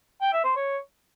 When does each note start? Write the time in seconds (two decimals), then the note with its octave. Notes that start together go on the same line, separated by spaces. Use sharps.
0.21 G5
0.33 E5
0.45 C5
0.56 C#5